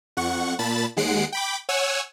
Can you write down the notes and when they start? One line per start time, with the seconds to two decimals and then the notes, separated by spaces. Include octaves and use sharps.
0.17 F2 F#5 C#6
0.59 A#2 A5 B5 A6
0.97 D#2 G#3 F#5 C7 D7
1.32 G5 B5 D6
1.69 C#5 F#5 G#5 E6